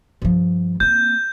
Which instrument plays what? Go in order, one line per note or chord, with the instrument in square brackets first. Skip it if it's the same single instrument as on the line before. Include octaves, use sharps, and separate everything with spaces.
[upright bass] G2 F3
[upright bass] A#3 C4 [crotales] G6